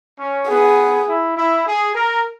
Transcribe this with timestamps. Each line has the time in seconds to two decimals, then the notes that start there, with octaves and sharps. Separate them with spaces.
0.19 C#4
0.48 B3 G#4
1.07 E4
1.36 E4
1.66 G#4
1.95 A#4